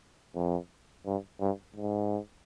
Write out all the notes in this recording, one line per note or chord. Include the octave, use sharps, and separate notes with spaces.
F2
G2
G2
G#2